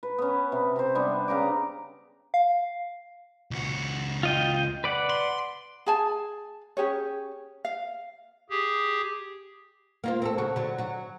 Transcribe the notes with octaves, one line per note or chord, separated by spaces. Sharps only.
B4
B3 C#4
C3
C3 C5
G3 B3 D4 G5
C#3 G4 A#5 D6
F5
C#2 F#4
F4 D#5 G5
B4 D5 F#5
C6
G#4 G#5 A5
C#4 G4 G#4 C#5
F5
G4 G#4
A#3 F4 C5
C4 C#4 A4
C#3 F#3 F#4
D3 F#3
F#3 F#4